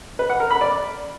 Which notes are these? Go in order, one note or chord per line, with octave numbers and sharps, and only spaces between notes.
B4
F#5
A#4
B5
D5